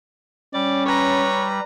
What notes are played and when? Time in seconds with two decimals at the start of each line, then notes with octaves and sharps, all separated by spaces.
0.54 G3 C#4 D5
0.86 B4 C#5 A#5